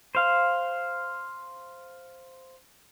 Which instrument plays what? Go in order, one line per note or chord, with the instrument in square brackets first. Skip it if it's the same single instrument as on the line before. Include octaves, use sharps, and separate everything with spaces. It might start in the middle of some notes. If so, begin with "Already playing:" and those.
[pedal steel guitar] C5 F5